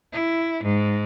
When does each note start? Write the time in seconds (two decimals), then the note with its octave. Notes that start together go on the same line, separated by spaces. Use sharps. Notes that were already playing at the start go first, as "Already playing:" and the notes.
0.13 E4
0.64 G#2